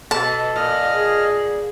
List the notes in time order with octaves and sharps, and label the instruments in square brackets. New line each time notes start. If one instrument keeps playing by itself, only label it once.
[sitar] B2 [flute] A4 [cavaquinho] A5
[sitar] A#2 [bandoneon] D#5 F6
[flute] G#4